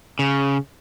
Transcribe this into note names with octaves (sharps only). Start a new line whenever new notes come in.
C#3